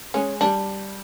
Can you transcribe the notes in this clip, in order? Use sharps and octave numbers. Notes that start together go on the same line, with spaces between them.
G#3 C#4
G3 D4